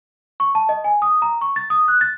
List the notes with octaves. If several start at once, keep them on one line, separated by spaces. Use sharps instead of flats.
C#6
A5
D#5
G#5
D#6
A#5
C#6
A6
D#6
F#6
A6